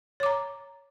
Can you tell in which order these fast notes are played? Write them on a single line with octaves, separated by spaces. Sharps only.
C#5 D6 A#5